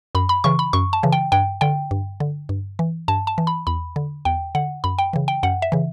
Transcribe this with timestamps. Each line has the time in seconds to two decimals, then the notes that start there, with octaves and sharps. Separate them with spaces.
0.15 F#2 B5
0.29 B5
0.44 C#3 E3 C#6
0.59 B5
0.73 F#2 C#6
0.93 A5
1.03 C#3 E3
1.12 G5
1.32 G2 G5
1.61 D3 G5
1.91 G2
2.20 D3
2.49 G2
2.79 E3
3.08 G2 A5
3.27 A5
3.38 E3
3.47 B5
3.67 E2 B5
3.96 D3
4.25 E2 G5
4.55 D3 F#5
4.84 F#2 B5
4.99 G5
5.13 C#3 E3
5.28 G5
5.43 F#2 F#5
5.62 E5
5.72 C#3 E3